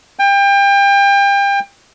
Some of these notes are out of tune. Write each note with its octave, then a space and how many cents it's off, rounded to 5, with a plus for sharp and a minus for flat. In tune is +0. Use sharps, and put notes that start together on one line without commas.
G5 +30